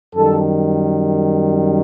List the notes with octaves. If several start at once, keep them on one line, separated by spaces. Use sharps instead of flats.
F#2 D#3 G3 A4